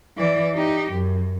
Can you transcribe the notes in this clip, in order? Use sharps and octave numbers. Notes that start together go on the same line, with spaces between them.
E3 D5
D#4 G4
F#2